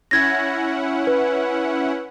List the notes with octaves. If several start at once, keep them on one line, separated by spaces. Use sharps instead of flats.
C#4 E4 F#5 G#6 A#6
B4